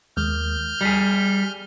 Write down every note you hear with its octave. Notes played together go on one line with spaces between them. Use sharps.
D#2 G#3 F6 G6
G3 G#4 B6